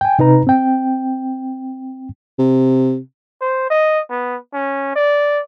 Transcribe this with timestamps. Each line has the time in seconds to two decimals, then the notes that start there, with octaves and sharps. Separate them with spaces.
0.01 G5 G#5
0.19 C3 D#4 B4 A#5
0.47 C4 G5
2.39 C3
3.41 C5
3.70 D#5
4.10 B3
4.53 C#4
4.96 D5